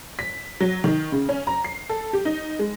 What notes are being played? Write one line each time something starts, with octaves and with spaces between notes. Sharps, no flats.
B6
F#3
D#3
C#3
C#4
A#5
C7
A4
G4
D#4
G#3